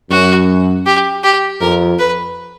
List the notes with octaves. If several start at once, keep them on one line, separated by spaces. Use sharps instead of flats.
F#2 F#4
G4
G4
F2 A#4
B4